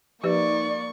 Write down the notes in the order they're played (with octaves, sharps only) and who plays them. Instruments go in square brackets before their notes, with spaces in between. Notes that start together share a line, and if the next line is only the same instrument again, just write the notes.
[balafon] F3 G4 B4 [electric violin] A#3 C#6 [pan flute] D#4 [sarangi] D5